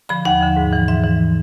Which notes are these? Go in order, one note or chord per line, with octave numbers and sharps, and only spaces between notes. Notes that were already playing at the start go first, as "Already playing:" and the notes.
D3 F3 B5
D#2 F#5
D3 F3
G#2
E3
G#2 E5
E3